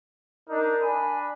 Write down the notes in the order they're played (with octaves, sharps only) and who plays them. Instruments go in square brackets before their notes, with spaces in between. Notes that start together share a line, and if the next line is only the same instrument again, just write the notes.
[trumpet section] D4 D#4 [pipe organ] A#4
[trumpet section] D4 A5 B5 [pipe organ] G#5